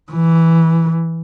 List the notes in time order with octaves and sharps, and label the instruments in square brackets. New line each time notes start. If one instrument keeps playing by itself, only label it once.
[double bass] E3